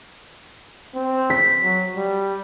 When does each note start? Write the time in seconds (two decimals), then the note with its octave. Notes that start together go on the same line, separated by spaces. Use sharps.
0.95 C4
1.30 B6
1.63 F#3
1.96 G3